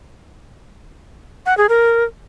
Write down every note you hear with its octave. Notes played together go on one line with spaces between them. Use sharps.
F#5
G#4
A#4